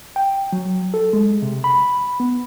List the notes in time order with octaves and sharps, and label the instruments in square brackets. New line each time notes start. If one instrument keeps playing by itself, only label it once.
[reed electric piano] G5
F#3
A4
G#3
C3
B5
B3